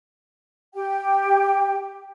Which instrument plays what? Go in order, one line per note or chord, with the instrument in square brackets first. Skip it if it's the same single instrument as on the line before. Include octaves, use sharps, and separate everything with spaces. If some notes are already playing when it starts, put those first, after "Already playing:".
[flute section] G4 G5